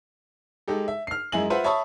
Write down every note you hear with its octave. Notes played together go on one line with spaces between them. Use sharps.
G#3 D#4 G4 A4
E5
F6 C7
F#2 G#3 E4 G#5 F#7
F4 B4 C5 E5 F#5
C#5 E5 A5 B5 C#6 D#6